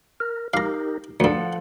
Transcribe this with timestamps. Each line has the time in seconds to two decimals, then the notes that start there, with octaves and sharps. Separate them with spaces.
0.20 A#4
0.54 D#4 G4 A#4 F5 A#5
1.20 D2 G2 F3 A4 F#5